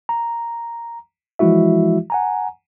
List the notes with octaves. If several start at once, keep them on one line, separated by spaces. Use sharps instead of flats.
A#5
E3 F3 G#3 E4 F#4 E5
F#5 G#5 A#5